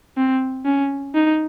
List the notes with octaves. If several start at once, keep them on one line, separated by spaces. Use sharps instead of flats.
C4
C#4
D#4